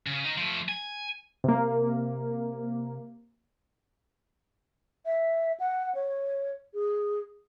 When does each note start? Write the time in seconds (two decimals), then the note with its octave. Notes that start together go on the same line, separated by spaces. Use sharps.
0.06 C#3
0.25 D#3 D#4
0.37 F3 A3
0.69 G#5
1.44 C3 A#3
5.06 E5
5.60 F#5
5.95 C#5
6.74 G#4